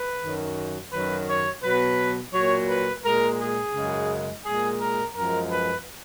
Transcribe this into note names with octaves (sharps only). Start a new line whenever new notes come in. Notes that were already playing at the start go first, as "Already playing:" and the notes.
Already playing: B4
F#2 D#3 F#3
F#2 D#3 F#3 B4
C#5
B2 F#3 B4
A#2 F#3 C#5
B4
A#2 G#3 A#4
G#4
F#2 C#3 G#3
A#2 G#3 G#4
A#4
F#2 F3 G#3 A#4
B4